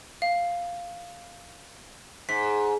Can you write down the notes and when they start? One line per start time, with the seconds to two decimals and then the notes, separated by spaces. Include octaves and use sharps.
0.22 F5
2.29 G#2 B6